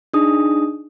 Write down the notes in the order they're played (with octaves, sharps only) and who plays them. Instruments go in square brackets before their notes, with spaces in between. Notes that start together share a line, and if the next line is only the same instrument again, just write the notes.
[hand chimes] D4 D#4 G#4 D#6